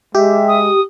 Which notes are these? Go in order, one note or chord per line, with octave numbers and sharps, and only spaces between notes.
G#3 G4 E5
D#6